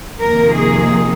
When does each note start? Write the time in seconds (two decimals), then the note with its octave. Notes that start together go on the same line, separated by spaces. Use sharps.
0.21 F2 C3 D#3 A#3 A#4
0.54 G#4